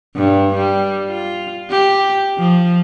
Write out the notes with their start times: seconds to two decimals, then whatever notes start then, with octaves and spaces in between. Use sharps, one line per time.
0.16 G2
0.55 G3
1.09 F4
1.70 G4
2.39 F3